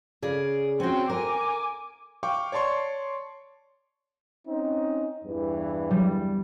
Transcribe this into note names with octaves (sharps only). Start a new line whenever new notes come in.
C#3 G#4 D5
C4 C#4 F#4 G5
A#4 G#5 D6
F5 G5 C#6 D6
C#5 D5 A5 C6 C#6
C4 C#4 D#4
E2 G2 E3
G3